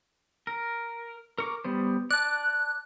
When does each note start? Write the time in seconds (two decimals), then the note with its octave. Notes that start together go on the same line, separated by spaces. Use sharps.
0.47 A#4
1.38 A#4 C#6 D6
1.65 G3 B3 C5
2.11 D5 A5 F#6